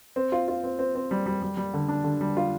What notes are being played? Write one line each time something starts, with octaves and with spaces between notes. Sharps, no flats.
C4
F4
F4
C4
C4
C4
G3
G3
G3
G3
D3
D4
D3
G3
F4